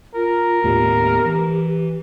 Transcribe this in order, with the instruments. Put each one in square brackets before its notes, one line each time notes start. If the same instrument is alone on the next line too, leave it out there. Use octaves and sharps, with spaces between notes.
[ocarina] F4 [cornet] A#4
[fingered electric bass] D#2 A2 B3 [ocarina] G4
[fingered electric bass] E3